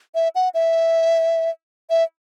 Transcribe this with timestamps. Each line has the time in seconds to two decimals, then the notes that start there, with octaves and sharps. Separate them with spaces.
0.15 E5
0.35 F#5
0.54 E5
1.90 E5